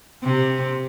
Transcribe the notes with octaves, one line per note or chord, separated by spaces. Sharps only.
C3